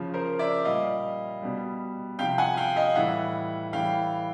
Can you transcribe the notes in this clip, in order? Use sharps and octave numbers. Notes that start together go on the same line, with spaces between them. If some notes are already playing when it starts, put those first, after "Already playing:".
Already playing: C#3 F3
A#4 C5
D5 E5
A#2 G3 D#5 F5
B2 G3
C3 F3 F5 G5
F#5 G#5
F5 G5
D#5 F5
A2 E3 G3 E5 F#5
A2 E3 G3 F5 G5